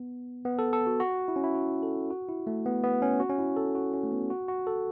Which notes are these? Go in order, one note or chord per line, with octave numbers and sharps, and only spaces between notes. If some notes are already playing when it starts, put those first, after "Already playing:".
Already playing: B3
B3
A4
A4
F#4
F#4
E4
C#4
E4
F#4
A4
F#4
E4
A3
B3
B3
C#4
F#4
C#4
E4
A4
F#4
C#4
A3
B3
F#4
F#4
A4